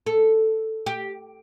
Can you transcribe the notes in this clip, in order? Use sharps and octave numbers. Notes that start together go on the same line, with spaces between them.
A4
G4